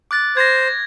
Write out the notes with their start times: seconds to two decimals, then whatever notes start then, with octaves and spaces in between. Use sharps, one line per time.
0.11 D6 F#6 A6
0.37 C5 G#6 A#6